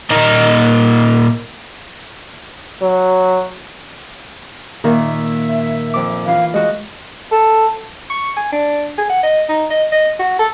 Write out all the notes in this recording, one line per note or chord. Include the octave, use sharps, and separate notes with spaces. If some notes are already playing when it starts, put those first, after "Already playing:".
A#2 A#3 D#4 A#4 D#5 A#5
F#3
A#2 D#3 A#4 E5
F2 D6
E3 F4 F5
G#3 F#4 D#5
A4
C#6
G#5
D4
G#4
F#5
D#5
D#4
D#5
D#5
F#4
A4